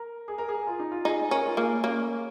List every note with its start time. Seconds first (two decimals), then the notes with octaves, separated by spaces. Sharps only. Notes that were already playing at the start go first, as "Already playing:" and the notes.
Already playing: A#4
0.28 G#4
0.38 A#4
0.49 G#4
0.67 F4
0.79 D#4
0.92 F4
1.05 D#4 G#4
1.31 C#4 A#4
1.46 F4
1.57 A#3 G#4
1.84 A#3 C#4